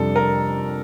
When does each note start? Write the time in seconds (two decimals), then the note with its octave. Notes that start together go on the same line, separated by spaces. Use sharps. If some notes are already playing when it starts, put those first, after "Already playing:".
Already playing: F2 C3 G3 D4 A4
0.16 A#4